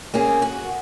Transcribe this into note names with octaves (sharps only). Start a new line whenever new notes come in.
A#3 C4 C#4 G#4
F#4